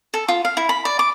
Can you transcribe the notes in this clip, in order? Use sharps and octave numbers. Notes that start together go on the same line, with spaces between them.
A4
F4
F5
E4
B5
D5
D6